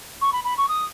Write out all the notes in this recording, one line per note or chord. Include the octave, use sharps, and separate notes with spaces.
C#6
B5
B5
C#6
D#6